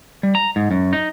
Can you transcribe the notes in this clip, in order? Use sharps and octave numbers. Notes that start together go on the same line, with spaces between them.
G3
A#5
G#2
F#2
D#4